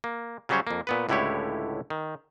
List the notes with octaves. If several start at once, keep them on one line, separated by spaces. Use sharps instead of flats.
A#3
C#3 F#3 G3 C#4 C5 C#5
F2 A#3
A#2 B3 B4
C#2 A2 D3 E4 G4 C#5
D#3